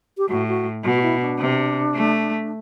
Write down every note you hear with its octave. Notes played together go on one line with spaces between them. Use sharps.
G4
A2 F#4
F#4
B2 F#4
F#4
E4
D4
C3
A3